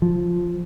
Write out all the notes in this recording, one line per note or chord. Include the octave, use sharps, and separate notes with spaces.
F3